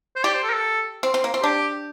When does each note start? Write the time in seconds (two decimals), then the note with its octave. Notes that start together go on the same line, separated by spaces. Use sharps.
0.16 C5
0.24 G4 D5
0.34 C5
0.43 A4
0.50 A#4
0.54 A4
1.03 C4
1.14 C4
1.24 A#3
1.34 C4
1.43 D4 G4